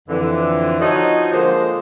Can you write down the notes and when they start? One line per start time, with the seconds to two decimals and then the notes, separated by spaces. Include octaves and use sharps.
0.09 F2 D3 E3
0.81 F3 F#3 D#4 F#4 C#5 D#5
1.32 D3 F3 G#3 A#3 C5